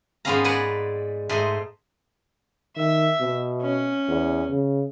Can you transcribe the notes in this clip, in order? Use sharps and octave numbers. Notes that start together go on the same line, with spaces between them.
G#2 G#3 B3 C#4 F5 A#5
B4 D5 F#5 G#5 A#5
G#2 A3 D#5 C6
D#3 E5
B2
C#4
E2
C#3